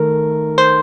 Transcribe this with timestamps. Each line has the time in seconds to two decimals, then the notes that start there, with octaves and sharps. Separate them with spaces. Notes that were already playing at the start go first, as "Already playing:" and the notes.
Already playing: D#3 A3 A#4
0.58 C5